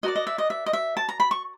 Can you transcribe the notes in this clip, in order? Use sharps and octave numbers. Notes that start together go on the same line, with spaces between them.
F#4 A#4 D5 D#5
D#5
E5
D#5
E5
D#5
E5
A5
A#5
B5
C#6